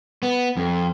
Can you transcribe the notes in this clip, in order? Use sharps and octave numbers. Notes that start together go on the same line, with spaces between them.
B3
F2